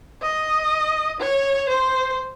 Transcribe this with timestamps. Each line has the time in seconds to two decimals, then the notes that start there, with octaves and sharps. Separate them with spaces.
0.22 D#5
1.20 C#5
1.69 C5